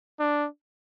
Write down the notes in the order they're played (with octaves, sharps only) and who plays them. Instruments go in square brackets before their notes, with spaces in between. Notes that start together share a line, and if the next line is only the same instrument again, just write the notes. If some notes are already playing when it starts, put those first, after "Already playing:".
[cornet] D4